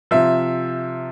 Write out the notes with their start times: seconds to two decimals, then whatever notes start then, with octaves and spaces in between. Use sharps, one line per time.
0.11 C3 F3 E5